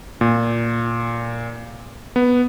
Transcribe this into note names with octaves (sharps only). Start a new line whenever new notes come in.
A#2
B3